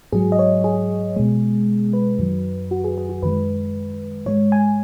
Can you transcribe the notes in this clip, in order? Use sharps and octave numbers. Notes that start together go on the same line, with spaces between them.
G#2 F#3 G#4
D#5
C#5
G#4
B2 G#3
B4
F#2 D#3 F#3
F#4
G#4
G#4
F#4
F#2 D#3 G#3 B4
G#2 G#3 C#5
G#5